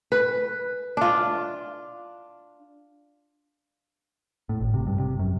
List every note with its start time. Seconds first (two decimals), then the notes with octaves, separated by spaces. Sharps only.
0.12 B4
0.97 D4 F4
4.49 A2
4.61 G#1
4.74 C3
4.87 G2
5.00 C3
5.19 F#2